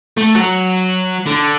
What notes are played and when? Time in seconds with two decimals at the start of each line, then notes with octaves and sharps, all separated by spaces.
0.18 A3
0.36 F#3
1.26 D3